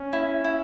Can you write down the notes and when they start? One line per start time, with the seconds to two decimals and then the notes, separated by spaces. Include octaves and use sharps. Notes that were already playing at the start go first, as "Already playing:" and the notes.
Already playing: C#4
0.13 E4
0.44 E4